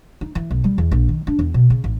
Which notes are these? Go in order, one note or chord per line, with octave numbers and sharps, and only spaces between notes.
D#4
E3
B1
G3
E2
A#1
D#3
D4
E2
B2
C#3
A1